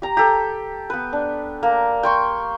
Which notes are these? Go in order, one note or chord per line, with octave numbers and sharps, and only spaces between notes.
G4 A#5
G4 A4
B3 B4
D4
A#3
G5 C6 C#6